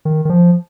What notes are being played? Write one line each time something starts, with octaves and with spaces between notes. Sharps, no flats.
D#3
D#3
F3